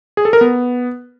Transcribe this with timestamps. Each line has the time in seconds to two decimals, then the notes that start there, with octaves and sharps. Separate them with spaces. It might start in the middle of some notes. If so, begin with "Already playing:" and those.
0.17 G#4
0.25 A4
0.33 A#4
0.41 B3